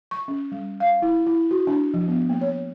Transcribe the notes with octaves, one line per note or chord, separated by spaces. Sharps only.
C#6
C#4
G3
F5
E4
E4
F#4
D4
F3
B3
A#3
C#5